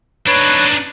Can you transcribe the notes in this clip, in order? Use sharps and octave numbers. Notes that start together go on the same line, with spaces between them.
D4 D#4 B4 C#5